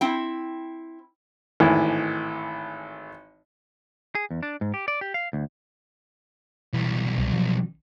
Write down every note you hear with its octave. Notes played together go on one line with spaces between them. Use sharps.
C4 E4 G5
G#1 A2 E3 E4
G#4
E2
D4
G#2
G4
D5
G4
F5
D2
B1 E3 G3
C2
F3 F#3